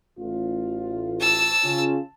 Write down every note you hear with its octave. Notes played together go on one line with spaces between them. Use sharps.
A1 F4
A5 E6
C#3 C#4 F4